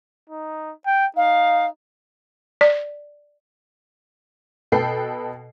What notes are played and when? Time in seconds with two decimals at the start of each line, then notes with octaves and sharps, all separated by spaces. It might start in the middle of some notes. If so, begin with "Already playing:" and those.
0.30 D#4
0.86 G5
1.16 D#4 F5
2.61 D5
4.72 B2 A4 B4 G5 C7